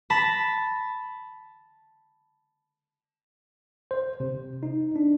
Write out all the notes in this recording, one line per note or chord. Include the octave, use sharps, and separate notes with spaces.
A5 B5 A#6 B6
C5
C3
D#4
D4